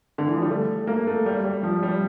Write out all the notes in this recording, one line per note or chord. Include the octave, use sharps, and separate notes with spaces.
D3
E3
F3
G3
A3
A#3
A3
G3
G3
F3
G3